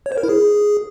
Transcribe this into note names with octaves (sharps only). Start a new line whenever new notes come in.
C#5
C5
A#4
E4
G#4